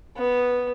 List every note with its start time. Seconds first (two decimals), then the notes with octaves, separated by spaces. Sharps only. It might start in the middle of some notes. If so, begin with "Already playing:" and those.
0.18 B3